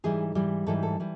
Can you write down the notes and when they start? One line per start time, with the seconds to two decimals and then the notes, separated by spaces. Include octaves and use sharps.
0.04 G#2 E3 G3 G#4
0.35 G#2 E3 G3
0.66 G#2 E3 G3 A4
0.83 A4
1.00 E3 G3